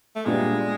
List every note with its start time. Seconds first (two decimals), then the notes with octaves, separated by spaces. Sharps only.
0.15 A3
0.25 A#2 G3 G#3 B3 D4 G4